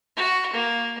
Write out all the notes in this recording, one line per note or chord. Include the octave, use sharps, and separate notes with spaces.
F#4
A#3